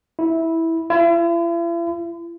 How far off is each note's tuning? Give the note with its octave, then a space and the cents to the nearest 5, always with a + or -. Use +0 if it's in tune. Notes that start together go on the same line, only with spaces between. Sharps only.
E4 -10
E4 +45